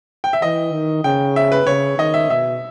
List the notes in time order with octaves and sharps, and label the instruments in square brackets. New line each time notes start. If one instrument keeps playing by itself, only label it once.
[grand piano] G5
E5
[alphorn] E3 [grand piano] D#5
[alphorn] D#3
[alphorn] C#3 [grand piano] G5
[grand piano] E5
B4
[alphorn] C#3 [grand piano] C#5
[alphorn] D#3 [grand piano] D#5
[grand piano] E5
[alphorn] B2 [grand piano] E5